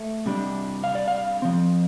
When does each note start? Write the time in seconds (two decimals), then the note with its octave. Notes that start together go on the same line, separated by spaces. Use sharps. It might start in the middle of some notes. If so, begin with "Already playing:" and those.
Already playing: A3
0.26 C3 G3 D4
0.84 F5
0.95 D5
1.08 F5
1.42 F3 C4